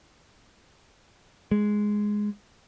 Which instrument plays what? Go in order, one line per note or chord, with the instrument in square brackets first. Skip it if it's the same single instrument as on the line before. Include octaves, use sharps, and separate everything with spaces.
[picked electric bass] G#3